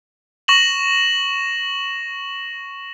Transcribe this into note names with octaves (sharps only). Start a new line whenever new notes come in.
C#6 A#6 E7 F#7